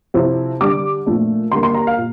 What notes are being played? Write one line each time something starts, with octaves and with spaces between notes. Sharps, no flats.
C3 F3 C4 E4
D3 G3 D4 D6
A#2 F3 A3 D4
D3 G3 A#3 C6
C6
A#5
F5
A#2